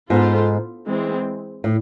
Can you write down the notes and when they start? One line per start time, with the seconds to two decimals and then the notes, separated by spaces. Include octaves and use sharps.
0.10 G#2 B3 F4 A4 C5
0.87 E3 G#3 C4
1.64 A2